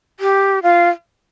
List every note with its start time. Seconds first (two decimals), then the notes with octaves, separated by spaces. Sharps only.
0.20 G4
0.63 F4